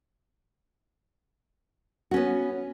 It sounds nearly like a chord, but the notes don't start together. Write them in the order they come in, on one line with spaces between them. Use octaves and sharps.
F#4 C#4 B3